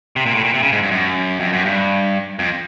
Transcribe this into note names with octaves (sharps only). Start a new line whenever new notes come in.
C3
A#2
A2
A#2
C3
C#3
G#2
G2
F#2
F2
F#2
G2
F2